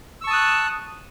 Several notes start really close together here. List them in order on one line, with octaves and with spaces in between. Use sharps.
E6 C#6 A5 D#6 F#6